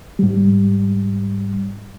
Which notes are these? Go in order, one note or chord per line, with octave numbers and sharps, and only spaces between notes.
G#2 G3